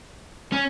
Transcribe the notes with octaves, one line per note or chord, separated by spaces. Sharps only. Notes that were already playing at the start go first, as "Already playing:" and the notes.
C#4